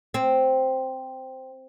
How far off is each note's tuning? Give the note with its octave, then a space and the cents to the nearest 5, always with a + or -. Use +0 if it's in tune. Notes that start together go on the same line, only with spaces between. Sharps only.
C4 +0